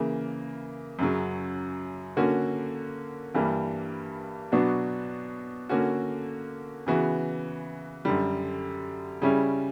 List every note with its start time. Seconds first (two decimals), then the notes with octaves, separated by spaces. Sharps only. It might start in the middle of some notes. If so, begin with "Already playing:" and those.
Already playing: C#3 E3 A#3
0.99 F#2 C#3 F#3
2.17 D3 A#3 C#4 F#4
3.34 G2 E3 G3 A#3
4.52 B2 F#3 B3 D4 F#4
5.69 D3 A#3 C#4 F#4
6.87 C#3 E3 B3 F#4
8.05 F#2 D3 G3
9.22 C#3 G3 C#4 E4